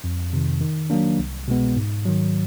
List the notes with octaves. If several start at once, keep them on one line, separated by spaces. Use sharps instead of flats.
F2
C3 D#3
D#3
F#3 A#3 D4
C2
B2 G#3 B3
G#2
D#3 F#3